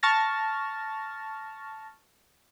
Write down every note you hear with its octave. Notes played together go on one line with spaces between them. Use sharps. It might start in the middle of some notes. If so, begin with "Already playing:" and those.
A5 C#6 F6 A6 A#6